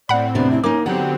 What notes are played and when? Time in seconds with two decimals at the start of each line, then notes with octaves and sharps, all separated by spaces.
0.09 A2 C4 D5 F#5 B5
0.35 E2 C3 B3 D4
0.51 E4
0.64 A#3 C#4 D#4 D6
0.86 D3 F#3 B3 C4 G4 F#5